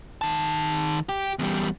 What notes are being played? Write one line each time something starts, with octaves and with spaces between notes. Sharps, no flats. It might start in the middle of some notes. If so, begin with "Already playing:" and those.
D#3 A5
G4
E2 G3